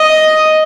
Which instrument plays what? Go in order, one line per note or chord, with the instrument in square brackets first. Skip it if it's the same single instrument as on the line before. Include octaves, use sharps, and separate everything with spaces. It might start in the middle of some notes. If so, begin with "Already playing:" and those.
Already playing: [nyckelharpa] D#5